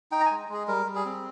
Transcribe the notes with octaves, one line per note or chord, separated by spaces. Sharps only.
D#4 G5
A#5
G#5
G#3
G#3 G#4
G3 A#4
G3
G#4
C4